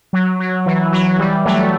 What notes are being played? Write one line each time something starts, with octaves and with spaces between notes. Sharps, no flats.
F#3
F#3
E3
F#3
E3 G3
F#3 A3